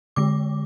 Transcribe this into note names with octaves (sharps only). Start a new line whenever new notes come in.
D3 G#3 D6